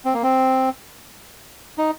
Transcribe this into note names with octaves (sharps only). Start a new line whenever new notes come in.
C4
A#3
C4
D#4